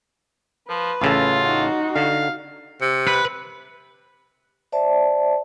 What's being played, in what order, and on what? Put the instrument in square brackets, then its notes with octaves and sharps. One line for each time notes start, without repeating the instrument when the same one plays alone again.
[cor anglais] F3 [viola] B4
[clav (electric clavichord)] A1 C#3 A4 [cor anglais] F4
[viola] D#4 F#4
[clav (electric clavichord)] D3 [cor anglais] F5
[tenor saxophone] C3
[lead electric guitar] B4
[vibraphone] C5 D5 E5 A5